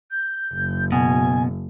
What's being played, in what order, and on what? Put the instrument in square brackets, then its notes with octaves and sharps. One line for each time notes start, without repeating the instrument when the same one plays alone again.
[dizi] G6
[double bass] F#1
[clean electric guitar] B2 [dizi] G#5